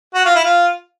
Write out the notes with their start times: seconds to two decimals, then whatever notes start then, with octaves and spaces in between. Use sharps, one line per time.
0.14 F#4
0.25 F4
0.36 E4
0.45 F4